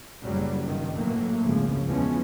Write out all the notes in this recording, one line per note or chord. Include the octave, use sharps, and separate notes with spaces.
F#1 F#3 G3
G2 D#3
A2 E3 F#3 A3 A#3
G#1 C#2 F#2 C#3 F3
E2 E3 F3 G#3 B3 C#4